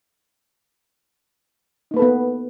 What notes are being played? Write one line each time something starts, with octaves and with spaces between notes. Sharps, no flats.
A#3 B3 D#4 A4 B4